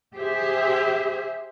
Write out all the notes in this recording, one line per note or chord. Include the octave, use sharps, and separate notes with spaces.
G4 G#4 C5 E5